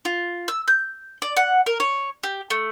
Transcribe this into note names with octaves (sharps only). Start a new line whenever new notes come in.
F4
E6
G6
D5
F#5
A#4
C#5
G4
A3